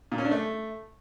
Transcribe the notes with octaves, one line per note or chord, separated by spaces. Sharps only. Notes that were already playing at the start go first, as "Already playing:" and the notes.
A#2
C#4
D4
A3